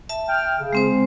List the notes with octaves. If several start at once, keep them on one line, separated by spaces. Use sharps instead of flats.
E5 A5
G5 F6
C#3
G#3 C4 C5